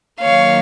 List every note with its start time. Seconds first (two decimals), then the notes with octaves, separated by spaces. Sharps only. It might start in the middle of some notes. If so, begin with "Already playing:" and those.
0.22 D#3 F#3 A#3 C#5 F5